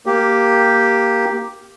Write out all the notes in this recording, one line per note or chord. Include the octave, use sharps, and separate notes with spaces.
A#3 G4